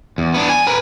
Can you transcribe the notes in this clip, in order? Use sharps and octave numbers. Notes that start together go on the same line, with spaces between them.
E2
B3 D4
G#5
A#4 B4